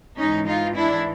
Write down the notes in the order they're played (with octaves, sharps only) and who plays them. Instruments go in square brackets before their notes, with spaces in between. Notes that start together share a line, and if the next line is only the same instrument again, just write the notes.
[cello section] G#2 E3 C#4 D#4
D#4 F4
D4 E4